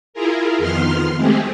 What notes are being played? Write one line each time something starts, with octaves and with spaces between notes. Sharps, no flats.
E4 F4 G#4 A#4
F2 D#3 F3 B3 C6 F6
G#3 A3 C4 G4 G#4